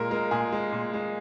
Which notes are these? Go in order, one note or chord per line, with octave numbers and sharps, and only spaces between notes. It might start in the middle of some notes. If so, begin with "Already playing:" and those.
Already playing: A#2 G#3 A#4
G#3 A#4
A#2 G#4
G#3
A#2
G#3